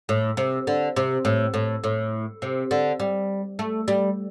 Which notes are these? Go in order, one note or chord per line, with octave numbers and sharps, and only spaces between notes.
A2
C3
D3
C3
A2
A2
A2
C3
D3
G3
A3
G3